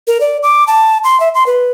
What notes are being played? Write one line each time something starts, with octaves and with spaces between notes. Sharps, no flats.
A#4
D5
D6
A5
C6
E5
C6
B4